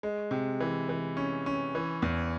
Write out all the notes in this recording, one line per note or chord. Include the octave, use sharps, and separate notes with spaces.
G#3
C3
E3
E3
C#4
C#4
E3
E2